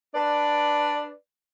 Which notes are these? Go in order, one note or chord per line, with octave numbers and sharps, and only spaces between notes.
D4 B4 D5